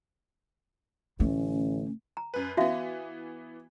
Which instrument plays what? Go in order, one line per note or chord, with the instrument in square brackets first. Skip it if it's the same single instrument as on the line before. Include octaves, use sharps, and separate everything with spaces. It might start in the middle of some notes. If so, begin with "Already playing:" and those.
[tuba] A1 [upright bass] D3 A3 [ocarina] C#4
[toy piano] A#5
[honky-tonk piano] F#2 B4
[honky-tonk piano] E3 B3 [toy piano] F#4 E5 F5